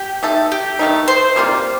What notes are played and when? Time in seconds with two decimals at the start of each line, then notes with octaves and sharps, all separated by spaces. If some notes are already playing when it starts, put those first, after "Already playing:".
Already playing: G4
0.23 A3 D#4 A4
0.52 G4
0.79 D#3 A3 D#4
1.08 C5
1.36 C3 G3 A#3 F4